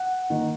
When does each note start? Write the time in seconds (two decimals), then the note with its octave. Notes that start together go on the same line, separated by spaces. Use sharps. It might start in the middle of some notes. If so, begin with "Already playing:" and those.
Already playing: F#5
0.30 D#3 A#3